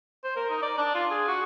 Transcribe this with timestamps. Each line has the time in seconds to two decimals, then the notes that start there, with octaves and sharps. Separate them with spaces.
0.24 C5
0.36 A#4
0.50 D#4
0.62 D5
0.78 D4
0.95 F4
1.11 G#4
1.28 F#4